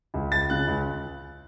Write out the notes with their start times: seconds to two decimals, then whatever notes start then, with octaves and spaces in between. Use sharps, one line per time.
0.14 C#2
0.32 C#2 A6
0.50 C#3 F#6
0.67 C#2